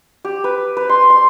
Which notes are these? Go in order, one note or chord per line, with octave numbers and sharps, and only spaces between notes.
G4
B4
B4
C6
C6